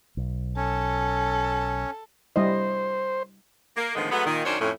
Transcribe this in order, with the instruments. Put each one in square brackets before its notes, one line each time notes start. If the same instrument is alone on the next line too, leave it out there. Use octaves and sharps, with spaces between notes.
[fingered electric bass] B1
[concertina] C#4 [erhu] A4
[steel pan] G3 E4 D#5 [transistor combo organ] C5
[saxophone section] A#3
A2 D3 D#3 F3 G#3 B3
F#3 G#3 A3 B3
A#2 D#3
F#2 D#3 C#4 D4 C5 C#5
F2 A2 C#4